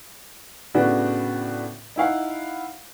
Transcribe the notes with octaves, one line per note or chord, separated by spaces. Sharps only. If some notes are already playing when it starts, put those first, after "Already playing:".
A2 C#3 B3 D4 F#4
D#4 E4 F5 F#5